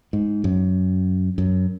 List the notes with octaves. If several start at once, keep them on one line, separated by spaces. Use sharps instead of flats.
G#2
F#2
F#2